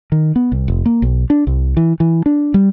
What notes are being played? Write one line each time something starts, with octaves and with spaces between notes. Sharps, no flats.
D#3
B3
C2
F1
A#3
B1
D4
C2
E3
E3
D4
G3